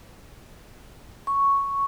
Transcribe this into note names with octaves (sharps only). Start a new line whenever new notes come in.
C#6